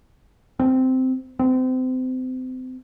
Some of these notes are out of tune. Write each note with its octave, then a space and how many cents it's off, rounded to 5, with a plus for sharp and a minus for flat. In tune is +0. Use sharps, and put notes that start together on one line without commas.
C4 -10
C4 -30